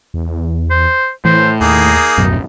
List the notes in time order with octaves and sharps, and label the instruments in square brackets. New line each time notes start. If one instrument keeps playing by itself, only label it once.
[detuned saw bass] E2
[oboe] C5
[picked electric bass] A2 [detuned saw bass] E3 [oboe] C5
[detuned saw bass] D#2 [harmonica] A#3 G#4 [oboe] D#4
[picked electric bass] D1 B1 [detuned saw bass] F#2